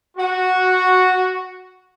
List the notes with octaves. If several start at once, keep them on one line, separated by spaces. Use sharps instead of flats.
F#4